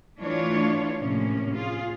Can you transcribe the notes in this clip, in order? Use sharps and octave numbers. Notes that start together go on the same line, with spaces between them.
E3 A3 D4 F4 C#5
A2 C3 F3 A#3 C#4
F4 G#4